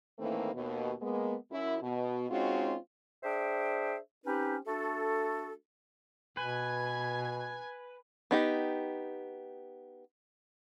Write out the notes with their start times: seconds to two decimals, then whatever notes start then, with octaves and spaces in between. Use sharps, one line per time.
0.19 A2 D#3 E3 A3 A#3 C4
0.54 D#2 B2
1.01 G#3 A#3 B3
1.51 F#2 E4
1.82 B2
2.30 G#3 C4 C#4 D#4 F4 F#4
3.23 D4 G#4 C5 E5 G5
4.26 C4 C#4 D#4 G4 B4
4.67 A3 D4 F#4 A4
6.37 B2 B4 G#5 G#6
8.31 B3 D#4 G4